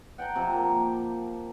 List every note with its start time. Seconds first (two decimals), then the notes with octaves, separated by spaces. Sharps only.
0.18 F#5 G5 A5 A#5
0.35 C3 F3
0.53 A#3